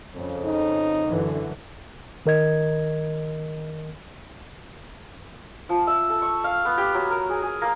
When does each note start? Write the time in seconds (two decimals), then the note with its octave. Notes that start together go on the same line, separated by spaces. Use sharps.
0.13 F2 C#3
0.45 D#4
1.07 F#2 D3 E3
2.26 D#3 A#4 D#5 G#6
5.69 F3
5.87 E5
6.09 A4
6.22 C#6
6.44 F5
6.65 B3
6.78 G4
6.94 F#3
7.11 A#4
7.29 G#4
7.42 G#4
7.62 A#3